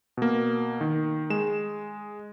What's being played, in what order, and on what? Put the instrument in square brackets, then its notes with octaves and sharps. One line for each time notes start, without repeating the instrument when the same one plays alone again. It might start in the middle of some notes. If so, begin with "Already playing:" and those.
[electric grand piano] B2 A#3
D#3
G#3 E7